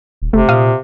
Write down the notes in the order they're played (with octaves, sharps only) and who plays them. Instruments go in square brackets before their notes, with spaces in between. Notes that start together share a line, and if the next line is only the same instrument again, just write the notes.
[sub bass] D#1
[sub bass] F#1 [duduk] C3 [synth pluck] A3
[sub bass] A#2 [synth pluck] F5 D#6